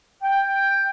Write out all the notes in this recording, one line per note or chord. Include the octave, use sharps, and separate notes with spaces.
G5